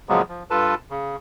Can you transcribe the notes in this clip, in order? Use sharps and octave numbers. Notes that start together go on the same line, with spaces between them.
A#2 C#3 F3 F#3 G#3 B3
F3
G2 F4 A4 B4 A5
C#3